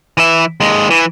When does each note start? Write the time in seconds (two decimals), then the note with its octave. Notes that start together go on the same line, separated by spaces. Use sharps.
0.18 E3 E5
0.60 D#2 G#3
0.90 E3